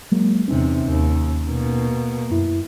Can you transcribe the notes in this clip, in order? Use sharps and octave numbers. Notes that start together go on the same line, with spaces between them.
F#3 G#3 A#3
E2 C3 C#4 D#4
D#2
B2 A#3
F#2 E4